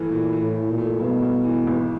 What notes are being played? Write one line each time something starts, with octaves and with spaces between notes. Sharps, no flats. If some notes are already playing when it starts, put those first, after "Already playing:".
Already playing: G2 E3 A3
A#2 E3
E3
A2
E3
A#2
A3
G2 B2
G2
E3
G#1